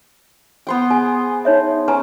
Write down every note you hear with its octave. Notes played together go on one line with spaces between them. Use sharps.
B3 C5 G5
G#4 G#5
D#4 C#5 E5
C#4 B4 G#5 A#5